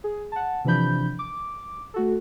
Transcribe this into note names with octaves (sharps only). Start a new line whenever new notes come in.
G#4
F#5 A5
C3 E3 F3 D4 B5 G6
D6
A3 F#4 A4